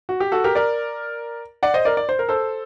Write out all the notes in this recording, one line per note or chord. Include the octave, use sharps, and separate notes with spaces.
F#4
G4
F#4 A4
G4 A#4
A#4 D5
D5 F#5
C5 D#5
A#4 D5
D5
C5
A#4
A4 C5